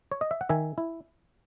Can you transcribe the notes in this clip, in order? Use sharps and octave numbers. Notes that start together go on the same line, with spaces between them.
C#5
D#5
E5
F#5
D#3 E5 G#5
E4